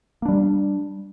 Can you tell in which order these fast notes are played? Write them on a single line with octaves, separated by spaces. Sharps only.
A#3 D4 G3